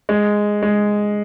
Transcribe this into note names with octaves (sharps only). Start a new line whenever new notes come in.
G#3
G#3